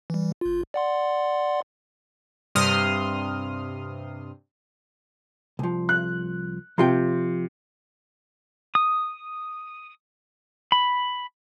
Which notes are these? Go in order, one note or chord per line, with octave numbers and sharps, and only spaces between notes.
E3 G3
G1 F4
D5 F#5 C6
G2 C3 C6 D#6 F6
C2 F3
F#6
C3 F3 F4 G5
D#6
B5